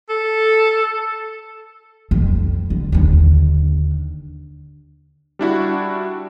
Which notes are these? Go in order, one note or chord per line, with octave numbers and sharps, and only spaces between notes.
A4
F2
D3
D#2 D3
G3 D4 E4 F#4